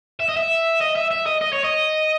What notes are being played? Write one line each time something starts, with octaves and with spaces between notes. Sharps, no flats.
E5
D#5
E5
D#5
E5
E5
D#5
D#5
C#5
D#5